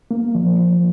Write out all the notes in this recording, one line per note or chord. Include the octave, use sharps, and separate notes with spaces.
A#3
F3
F3